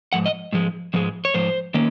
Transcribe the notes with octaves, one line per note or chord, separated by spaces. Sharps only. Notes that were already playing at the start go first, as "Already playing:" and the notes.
G#2 F3 F#5
D#5
G#2 F3 G#3
G#2 F3 G#3
C#5
G#2 F3 C5
D#3 A#3 C#4